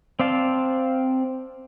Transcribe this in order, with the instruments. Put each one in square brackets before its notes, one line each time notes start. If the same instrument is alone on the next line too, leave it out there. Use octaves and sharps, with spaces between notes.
[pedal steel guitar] C4 D5 F5 A5